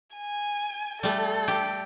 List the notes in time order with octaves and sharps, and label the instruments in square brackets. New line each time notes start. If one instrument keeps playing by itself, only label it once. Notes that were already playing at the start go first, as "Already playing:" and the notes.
[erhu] G#5
[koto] G3 A3 [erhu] A4
[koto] G4